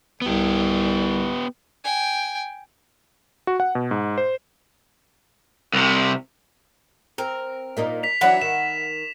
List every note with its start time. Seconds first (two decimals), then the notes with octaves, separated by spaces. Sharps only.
0.22 C2 B3 G4
1.84 G5 G#5
3.47 F#4
3.60 F#5
3.75 B2
3.91 G#2
4.18 C5
5.73 C2 C3
7.18 C4 A#4
7.77 A#2 A#3 D#4
8.03 B6 F7
8.21 E3 F#3 D4 E5 F#5 B5
8.42 D#3 E7